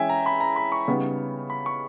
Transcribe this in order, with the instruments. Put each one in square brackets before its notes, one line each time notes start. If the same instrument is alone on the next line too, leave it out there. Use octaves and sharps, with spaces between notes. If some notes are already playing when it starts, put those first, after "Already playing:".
Already playing: [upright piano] E3 G#3 C#4 G#4 [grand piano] E5 G5 G#5
[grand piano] A#5
B5
A#5
B5
C#6
[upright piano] C#3 G3 B3 D#4
[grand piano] B5
C#6